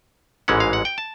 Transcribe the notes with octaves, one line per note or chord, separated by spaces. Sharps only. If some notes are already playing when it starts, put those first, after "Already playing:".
A1 G#2 E3 G#3 C#4 F#5
F5
F#5
G5
A5